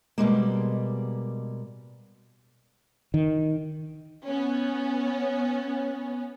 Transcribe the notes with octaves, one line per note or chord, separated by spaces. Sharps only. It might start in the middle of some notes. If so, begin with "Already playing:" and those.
B2 G3 G#3 A#3
D#3
B3 C#4